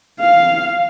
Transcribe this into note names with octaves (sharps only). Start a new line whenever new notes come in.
F5